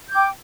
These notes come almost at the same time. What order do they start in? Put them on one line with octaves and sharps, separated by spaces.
G6 D6 G5